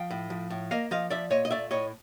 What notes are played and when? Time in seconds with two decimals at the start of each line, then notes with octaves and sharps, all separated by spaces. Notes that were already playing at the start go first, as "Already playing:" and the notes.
Already playing: F3 F5 G5
0.10 A2
0.30 F3
0.50 A2
0.71 A#3 D#5 F5
0.91 F3 D#5 F5
1.10 F3 D5 E5
1.31 A#2 C#5 D#5
1.45 D#5
1.51 A3 D5 E5
1.71 A2 C#5 D#5